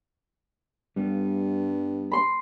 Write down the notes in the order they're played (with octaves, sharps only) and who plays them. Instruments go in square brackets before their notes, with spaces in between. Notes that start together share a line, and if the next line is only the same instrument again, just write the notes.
[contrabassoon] G2 [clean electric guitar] G3 B3
[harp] B5 C6